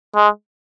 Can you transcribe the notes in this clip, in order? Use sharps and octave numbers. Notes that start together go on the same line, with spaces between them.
G#3